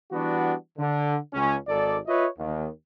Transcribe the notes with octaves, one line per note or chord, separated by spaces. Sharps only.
E3 G3 B3 D4 F#4
D3
C#2 C#4
G#1 G#2 A4 D5
F4 B4 C#5 D#5 E5
D#2